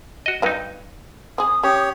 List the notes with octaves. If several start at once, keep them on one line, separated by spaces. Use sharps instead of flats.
F#4 D#5
G2 F#3 D#4 B4 D#5 F5
C4 G#4 D#6
C#4 G4 C#5